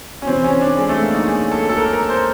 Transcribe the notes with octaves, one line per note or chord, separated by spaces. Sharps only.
C#4
C3 E3 C4
C#4
D4
G#3
A3
A#3
D#4
G#4
A4
A4
A#4
A#4
C5